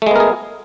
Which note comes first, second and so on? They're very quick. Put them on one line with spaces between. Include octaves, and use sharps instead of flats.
A3 G#3 B3 A#4 G#4